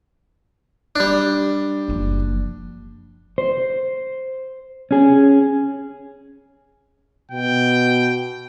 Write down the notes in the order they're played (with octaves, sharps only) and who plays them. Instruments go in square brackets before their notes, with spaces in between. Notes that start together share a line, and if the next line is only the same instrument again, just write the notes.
[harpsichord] G3 D4
[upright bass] F#1 F3
[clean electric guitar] C5
C#4 G#4
[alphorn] B2 [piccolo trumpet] G5